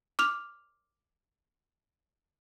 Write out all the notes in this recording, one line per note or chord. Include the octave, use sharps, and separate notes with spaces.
D6 F6 F7